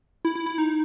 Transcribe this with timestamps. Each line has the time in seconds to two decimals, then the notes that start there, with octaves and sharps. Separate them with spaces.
0.25 E4
0.35 E4
0.46 E4
0.58 D#4